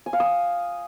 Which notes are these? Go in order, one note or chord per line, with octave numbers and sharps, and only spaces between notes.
G#5
F5
D#6